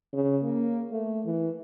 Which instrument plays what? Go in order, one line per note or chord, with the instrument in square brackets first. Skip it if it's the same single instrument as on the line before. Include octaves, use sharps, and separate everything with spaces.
[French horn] C#3
A#3
A3
E3